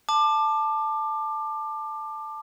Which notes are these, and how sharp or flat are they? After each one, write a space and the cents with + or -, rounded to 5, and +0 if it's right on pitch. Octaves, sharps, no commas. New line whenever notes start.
A5 +0 D6 +25